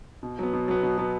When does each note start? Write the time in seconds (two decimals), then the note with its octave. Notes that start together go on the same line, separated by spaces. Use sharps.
0.23 B2
0.39 F#3 B3
0.53 B2
0.68 F#3 B3
0.83 B2
0.98 F#3 B3